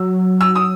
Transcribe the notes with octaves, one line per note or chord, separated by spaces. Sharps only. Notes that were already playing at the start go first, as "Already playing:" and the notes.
Already playing: F#3 E6
E6
D#6